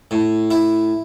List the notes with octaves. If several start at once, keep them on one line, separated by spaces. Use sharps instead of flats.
A2
E4